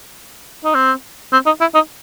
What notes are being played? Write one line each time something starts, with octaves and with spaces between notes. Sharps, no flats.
D#4
C4
C4
D#4
E4
D#4